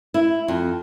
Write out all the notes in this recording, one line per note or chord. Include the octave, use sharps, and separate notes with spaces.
E4
F2